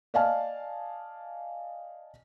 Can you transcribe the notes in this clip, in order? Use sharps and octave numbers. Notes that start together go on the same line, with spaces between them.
D5 D#5 F5 G#5 A5 F6